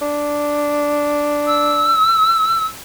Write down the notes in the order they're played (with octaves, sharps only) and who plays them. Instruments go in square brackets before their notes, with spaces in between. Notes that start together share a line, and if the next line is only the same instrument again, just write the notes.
[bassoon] D4
[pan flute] E6